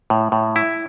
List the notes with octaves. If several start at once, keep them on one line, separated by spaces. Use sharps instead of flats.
A2
A2
E4